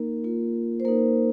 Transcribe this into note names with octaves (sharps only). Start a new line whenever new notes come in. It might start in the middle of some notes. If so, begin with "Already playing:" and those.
Already playing: A#3 D#4 A#4
A#3 F4
C5
A#3 D#4 A#4